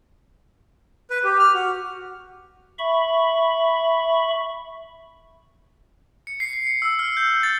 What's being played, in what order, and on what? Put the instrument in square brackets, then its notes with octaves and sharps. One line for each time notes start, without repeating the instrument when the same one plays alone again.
[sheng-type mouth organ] B4
G4
F6
F#4
[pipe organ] E5 B5 C#6
[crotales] C#7
C7
C7
C#7
E6
F6
G6
A6